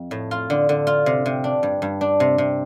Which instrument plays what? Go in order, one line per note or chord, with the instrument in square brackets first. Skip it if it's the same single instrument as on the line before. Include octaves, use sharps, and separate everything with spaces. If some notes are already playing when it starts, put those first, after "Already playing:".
Already playing: [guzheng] F2
A2
F4
D3
D3
F4
C3
C3
D4
G2
G2
D4
C3
C3